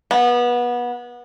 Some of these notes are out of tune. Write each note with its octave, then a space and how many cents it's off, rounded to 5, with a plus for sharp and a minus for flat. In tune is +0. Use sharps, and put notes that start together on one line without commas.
B3 -25